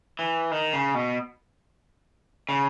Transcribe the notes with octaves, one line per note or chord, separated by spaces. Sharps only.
E3
D#3
C#3
B2
C#3